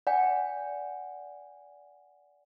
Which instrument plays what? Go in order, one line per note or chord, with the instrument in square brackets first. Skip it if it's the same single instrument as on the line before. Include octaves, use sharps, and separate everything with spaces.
[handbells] D5 F#5 G#5